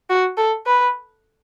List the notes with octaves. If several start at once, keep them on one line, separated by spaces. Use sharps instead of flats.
F#4
A4
B4